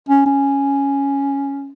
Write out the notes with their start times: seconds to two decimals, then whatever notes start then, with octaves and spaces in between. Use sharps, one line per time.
0.09 C#4
0.26 C#4